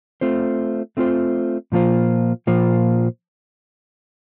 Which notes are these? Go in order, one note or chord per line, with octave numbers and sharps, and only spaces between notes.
A3 C4 F4 C5
A3 C4 F4 C5
A#2 F3 A#3 F4 C5
A#2 F3 A#3 F4 C5